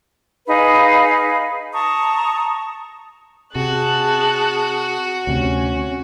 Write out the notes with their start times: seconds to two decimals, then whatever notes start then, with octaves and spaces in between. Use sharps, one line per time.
0.48 D#4 G#4 B4 F5
1.73 A5 A#5 C#6 D#6
3.55 C3 F#4 G#4 A5 F#6
5.27 D2 C3 C#4